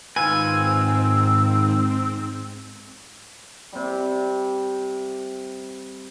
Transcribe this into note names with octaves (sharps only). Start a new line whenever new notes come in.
G#2 D#3 C4 F4 B4 G#5 E6
C3 G3